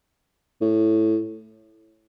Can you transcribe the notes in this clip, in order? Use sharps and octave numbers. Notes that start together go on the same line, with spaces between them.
A2